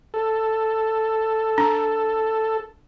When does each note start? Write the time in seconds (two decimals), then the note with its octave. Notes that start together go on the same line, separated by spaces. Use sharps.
0.14 A4
1.58 D4